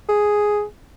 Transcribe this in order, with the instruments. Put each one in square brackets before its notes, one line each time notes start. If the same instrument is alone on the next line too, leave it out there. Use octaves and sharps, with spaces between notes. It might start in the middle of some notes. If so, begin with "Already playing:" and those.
[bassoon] G#4